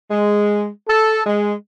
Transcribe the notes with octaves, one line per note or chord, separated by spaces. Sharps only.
G#3
A4
G#3